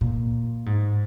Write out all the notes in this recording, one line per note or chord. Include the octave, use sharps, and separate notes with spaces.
A#2
G#2